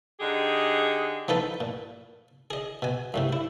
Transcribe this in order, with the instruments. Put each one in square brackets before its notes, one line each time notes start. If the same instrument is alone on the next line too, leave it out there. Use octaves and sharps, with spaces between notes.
[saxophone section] D3 D#4 G4 G#4
[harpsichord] F3 B3 D#4 A4 B4
A#2
G#4 D#5
B2 G#5
F#2 A2 C3
E4